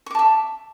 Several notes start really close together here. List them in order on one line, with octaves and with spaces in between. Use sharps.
C#6 D6 A5 E5